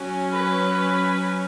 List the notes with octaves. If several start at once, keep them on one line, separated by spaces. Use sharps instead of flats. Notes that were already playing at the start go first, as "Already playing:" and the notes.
Already playing: F#3 C#4
B4